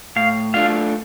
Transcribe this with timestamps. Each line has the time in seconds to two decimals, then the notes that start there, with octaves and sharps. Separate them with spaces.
0.16 A2 F5
0.54 A3 D4 F4 F5